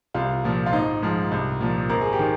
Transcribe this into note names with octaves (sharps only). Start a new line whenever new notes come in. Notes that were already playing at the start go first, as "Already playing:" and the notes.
C2 F4
A#2 F3
F4
G#1 D#4
G#2 F3
C2
A#2 F3
G#1 A#4
G#4
G4
D#3